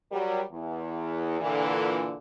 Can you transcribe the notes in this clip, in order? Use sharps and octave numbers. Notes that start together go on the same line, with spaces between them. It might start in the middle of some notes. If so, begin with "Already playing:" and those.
F#3 G3 A#4
E2
A#2 D3 E3